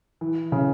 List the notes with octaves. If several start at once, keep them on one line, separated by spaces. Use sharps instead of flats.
E3
C#3